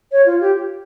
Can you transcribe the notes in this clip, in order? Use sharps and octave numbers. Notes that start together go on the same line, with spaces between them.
C#5
F4
G4